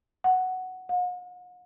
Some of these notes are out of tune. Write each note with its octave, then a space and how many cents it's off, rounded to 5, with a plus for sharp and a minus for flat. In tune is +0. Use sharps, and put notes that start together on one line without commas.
F#5 +5
F#5 -45